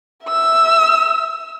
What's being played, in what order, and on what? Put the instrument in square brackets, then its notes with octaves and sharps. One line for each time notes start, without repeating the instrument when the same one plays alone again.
[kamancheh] E5 E6